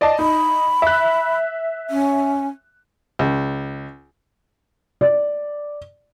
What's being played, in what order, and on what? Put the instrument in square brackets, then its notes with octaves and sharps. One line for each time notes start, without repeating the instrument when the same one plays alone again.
[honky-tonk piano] D5 D#5 A5
[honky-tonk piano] D#4 [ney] B5
[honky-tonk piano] E5 F#6
[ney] C#4
[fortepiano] C#2
[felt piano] D5